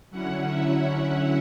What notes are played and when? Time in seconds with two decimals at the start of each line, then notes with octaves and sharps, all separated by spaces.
0.11 D3 F#3 C#4 E4 F#5
0.48 E5